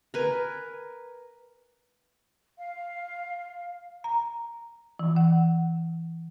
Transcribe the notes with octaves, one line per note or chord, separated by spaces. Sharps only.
A#4 B4 G#5
F5
A#5
E3
F#5